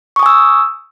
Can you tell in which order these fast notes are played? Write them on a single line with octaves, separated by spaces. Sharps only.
C#6 D#6 G#5 E6